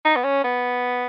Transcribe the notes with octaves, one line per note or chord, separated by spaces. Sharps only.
D#4
B3
C#4
B3